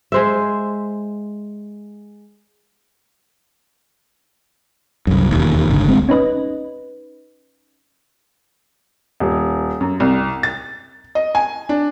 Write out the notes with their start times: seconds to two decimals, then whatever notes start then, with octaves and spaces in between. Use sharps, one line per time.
0.12 G#3 C5 E5
5.07 C2 F#2
5.31 E1 D#2
5.70 G1 C#2 D3
5.88 D#1 D2 G#3 C4
6.09 C#4 D#4 B4 D#5
9.20 D#1
9.81 F#2
10.00 C2
10.43 A6
11.15 D#5
11.35 G#5
11.69 D4